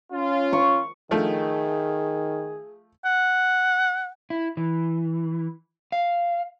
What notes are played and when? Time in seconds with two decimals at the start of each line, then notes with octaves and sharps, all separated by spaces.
0.13 C#4 F4
0.53 C#6
1.11 D#3 F3 A3 G#4
3.05 F#5
4.30 E4
4.57 E3
5.92 F5